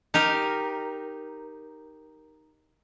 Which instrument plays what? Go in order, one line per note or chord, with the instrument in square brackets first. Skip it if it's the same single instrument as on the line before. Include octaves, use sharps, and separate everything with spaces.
[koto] D#4 G4 A#4